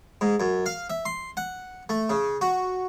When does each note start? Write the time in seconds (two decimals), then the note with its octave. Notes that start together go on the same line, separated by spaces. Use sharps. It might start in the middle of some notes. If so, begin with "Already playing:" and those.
0.21 G#2
0.40 F#2
0.66 F5
0.90 E5
1.05 C6
1.37 F#5
1.89 A3
2.09 C#3
2.41 F#4